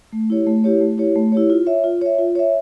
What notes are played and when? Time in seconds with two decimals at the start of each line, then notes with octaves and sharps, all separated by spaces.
0.12 A3
0.30 E4 G4 C#5
0.47 A3
0.64 E4 G4 C#5
0.81 A3
0.98 E4 G4 C#5
1.16 A3
1.32 E4 G4 C#5
1.50 F4
1.66 C#5 E5
1.84 F4
2.01 C#5 E5
2.19 F4
2.35 C#5 E5